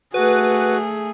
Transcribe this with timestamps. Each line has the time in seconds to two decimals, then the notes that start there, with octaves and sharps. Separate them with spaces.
0.14 A3 F#4 G#4 B4